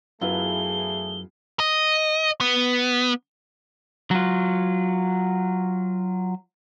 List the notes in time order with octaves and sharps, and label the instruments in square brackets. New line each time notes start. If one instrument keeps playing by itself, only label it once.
[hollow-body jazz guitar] F#2 [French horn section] E3 A3 G#4 [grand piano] B3 E4 F4 [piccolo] G7
[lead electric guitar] D#5
B3
F#3 F4